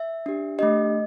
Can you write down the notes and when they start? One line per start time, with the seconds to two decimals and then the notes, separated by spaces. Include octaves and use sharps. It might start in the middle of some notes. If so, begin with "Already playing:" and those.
Already playing: E5
0.26 D4 G4
0.59 A3 D4 G4 D#5